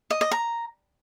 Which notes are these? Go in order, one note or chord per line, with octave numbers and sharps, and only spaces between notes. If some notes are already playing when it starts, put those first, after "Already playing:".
D#5
D#5
A#5